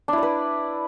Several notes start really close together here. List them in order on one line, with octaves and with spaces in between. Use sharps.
D4 E4 D5 B4